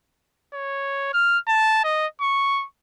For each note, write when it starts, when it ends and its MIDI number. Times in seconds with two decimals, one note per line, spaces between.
0.54 1.11 73
1.14 1.38 89
1.48 1.84 81
1.84 2.07 75
2.21 2.66 85